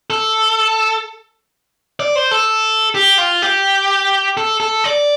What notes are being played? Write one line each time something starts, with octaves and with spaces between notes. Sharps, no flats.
A4
D5
C5
A4
G4
F4
G4
A4
A4
D5